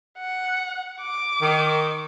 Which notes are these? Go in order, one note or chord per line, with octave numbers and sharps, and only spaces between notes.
F#5
D6
D#3